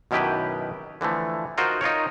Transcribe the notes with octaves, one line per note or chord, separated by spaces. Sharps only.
F#2 B2 D#3 E4 G4 B4
D3 E3 F3 A3
D#4 F4 F#4 A#4 C5
D#4 F4 A#4 C#5